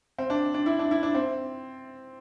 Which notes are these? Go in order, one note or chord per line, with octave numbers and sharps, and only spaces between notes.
C4
D4
D4
E4
D4
E4
D4
C4